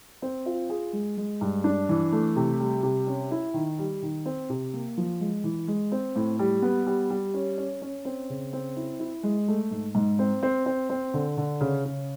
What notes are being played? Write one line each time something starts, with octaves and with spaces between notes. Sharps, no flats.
C4
F4
G#4
G#3
G#3
G2
D4
E3
A3
C3
G3
C3
C#4
E4
D#3
G3
D#3
C4
C3
A#3
F3
G#3
E3
G#3
C4
A2
G3
B3
G3
G3
C#4
C#4
C#4
C4
C#3
C4
E4
E4
G#3
A3
G#2
G#2
C4
C4
C4
C4
D3
D3
C#3
C#3